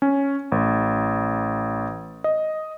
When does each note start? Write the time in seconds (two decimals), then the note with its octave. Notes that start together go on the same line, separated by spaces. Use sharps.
0.02 C#4
0.52 A1
2.24 D#5